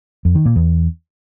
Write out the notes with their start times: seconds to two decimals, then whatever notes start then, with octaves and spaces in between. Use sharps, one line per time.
0.25 F2
0.35 D#3
0.45 A#2
0.56 E2